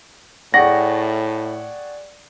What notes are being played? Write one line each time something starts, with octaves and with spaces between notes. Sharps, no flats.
A2 G#4 D5 F#5 G5 C#6 A#6